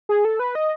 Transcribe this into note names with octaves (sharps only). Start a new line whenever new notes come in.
G#4
A4
B4
D#5